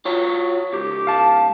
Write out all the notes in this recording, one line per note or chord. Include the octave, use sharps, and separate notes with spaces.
F4 F#4 C#5
C#2 G#2 G4
F5 A5